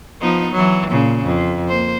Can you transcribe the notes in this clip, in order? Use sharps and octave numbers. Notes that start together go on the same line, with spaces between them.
F3 B3 D#4
E3 F#3
A#2 C#3
F2
A#3 C5